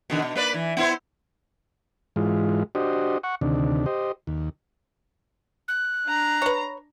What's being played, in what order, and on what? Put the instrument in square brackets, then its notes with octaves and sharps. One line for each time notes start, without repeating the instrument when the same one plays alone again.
[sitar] B2 D3 D#3
B2
A#3 B4 D5
E3
B3 E4 C5
[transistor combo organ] G#2 E3 G#3 F4
D4 F#4 G4 C5 D#5
F#5 C#6
D2 C3 D#3 D4
G4 C5 D#5
D#2
[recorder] F#6
[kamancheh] D4 A#5
[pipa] B4 C#5